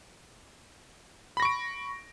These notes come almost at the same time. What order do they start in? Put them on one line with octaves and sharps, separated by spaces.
B5 A#6 C#6 D7